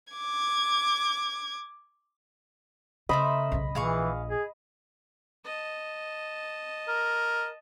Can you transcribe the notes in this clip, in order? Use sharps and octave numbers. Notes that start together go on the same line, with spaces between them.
D6 G#6
C#3 A3 A#4 C5 D#5 B5
B1 C#3
A#1 E3 G#4 F5 C#6
G#4
D#5 A5
A#4